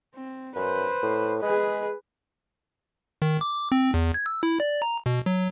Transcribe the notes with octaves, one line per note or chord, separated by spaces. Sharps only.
C4
F#2 B4 C5
A2
G#3 G#4 B4
D#3
D6
C4
E2
G#6
E6
E4
D5
A#5
B2
F#3